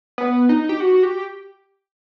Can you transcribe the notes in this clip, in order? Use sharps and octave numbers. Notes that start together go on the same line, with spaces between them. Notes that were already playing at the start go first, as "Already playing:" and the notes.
B3
D#4
G4
F#4
G4